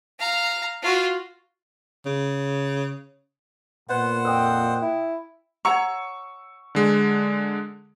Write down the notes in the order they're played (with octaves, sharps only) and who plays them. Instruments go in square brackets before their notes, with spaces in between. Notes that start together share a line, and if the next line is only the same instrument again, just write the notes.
[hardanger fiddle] F5 A#5
F4 F#4
[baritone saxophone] C#3
[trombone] A#2 [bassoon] B3 [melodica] C5 F#5
[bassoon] F2 [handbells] G5 D#6 E6
[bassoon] E4
[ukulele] C#5 F#5 A#5 [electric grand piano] C#6 E6 C#7
[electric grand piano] D3 G#3